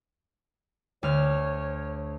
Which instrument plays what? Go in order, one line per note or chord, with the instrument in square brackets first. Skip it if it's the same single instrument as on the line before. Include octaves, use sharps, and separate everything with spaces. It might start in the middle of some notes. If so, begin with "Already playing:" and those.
[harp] D2 F6 [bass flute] C#5